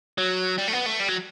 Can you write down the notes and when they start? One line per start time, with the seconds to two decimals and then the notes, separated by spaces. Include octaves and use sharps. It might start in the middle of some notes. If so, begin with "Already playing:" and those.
0.18 F#3
0.58 G3
0.68 A3
0.73 B3
0.86 A3
1.00 G3
1.08 F#3